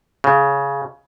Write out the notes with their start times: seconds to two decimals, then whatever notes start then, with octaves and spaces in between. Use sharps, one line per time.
0.24 C#3